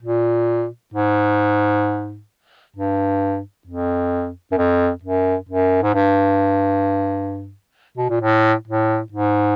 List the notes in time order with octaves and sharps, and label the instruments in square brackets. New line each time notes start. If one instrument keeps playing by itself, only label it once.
[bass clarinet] A#2
G#2
G2
F2
F#2
F2
F#2
F#2
G#2
G2
B2
A#2
A2
A2
G#2